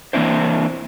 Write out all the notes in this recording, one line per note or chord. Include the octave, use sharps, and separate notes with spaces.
E3 A#3 C4 D4 E4 C5